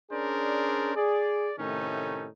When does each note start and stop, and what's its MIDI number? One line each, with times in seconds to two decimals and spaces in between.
0.10 0.95 61
0.10 0.95 62
0.10 0.95 68
0.10 0.95 70
0.10 0.95 72
0.10 0.95 74
0.96 1.51 68
0.96 1.51 74
1.58 2.26 45
1.58 2.26 48
1.58 2.26 51
1.58 2.26 57
1.58 2.26 61
1.58 2.26 63